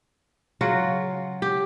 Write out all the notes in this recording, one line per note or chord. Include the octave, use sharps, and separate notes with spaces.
C#3 F#3 F4 F#4
G4